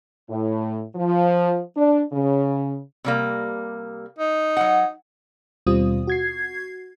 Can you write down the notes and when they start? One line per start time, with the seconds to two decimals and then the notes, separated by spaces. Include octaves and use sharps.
0.29 A2
0.96 F3
1.75 D4
2.12 C#3
3.04 C3 G3 A#3
4.19 D#4
4.57 F#3 F#5
5.67 D#2 B2 G3 C4 F4 D#6
6.07 F#4 G#6 C7